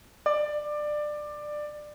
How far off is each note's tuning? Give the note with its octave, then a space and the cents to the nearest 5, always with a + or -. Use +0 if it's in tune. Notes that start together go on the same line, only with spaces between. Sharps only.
D5 +20